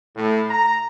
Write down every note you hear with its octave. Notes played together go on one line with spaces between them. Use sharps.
A2
A#5